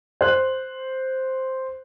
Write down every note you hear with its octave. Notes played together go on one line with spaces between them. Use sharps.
C5 F#6